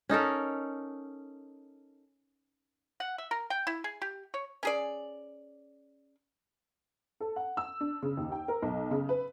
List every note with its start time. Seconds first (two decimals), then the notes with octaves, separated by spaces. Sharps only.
0.09 C#4 D#4 A4 A#4
3.00 F#5
3.18 E5
3.31 A#4
3.50 G5
3.67 E4
3.84 G#4
4.02 G4
4.34 C#5
4.63 C#4 G#4 D5
7.21 A4
7.36 F#5
7.57 E6
7.81 D4
8.02 C#3
8.17 D#2
8.32 G5
8.48 A#4
8.62 B1
8.91 C#3
9.09 B4